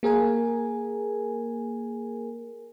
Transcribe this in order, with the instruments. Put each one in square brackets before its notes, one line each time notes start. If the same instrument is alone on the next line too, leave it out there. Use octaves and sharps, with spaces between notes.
[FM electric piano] A#3 G#4 A#4 G#5